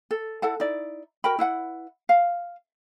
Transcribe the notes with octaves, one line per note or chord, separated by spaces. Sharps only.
A4
E4 A4 F#5 A5
D#4 E4 D5
F#4 A#4 G5 B5
E4 B4 F#5
F5